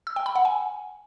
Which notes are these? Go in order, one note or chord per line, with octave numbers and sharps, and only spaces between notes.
E6
G5
B5
F#5
G#5